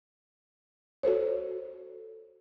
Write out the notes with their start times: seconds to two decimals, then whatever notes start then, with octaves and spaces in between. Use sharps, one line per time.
1.03 F#4 A4 C5 C#5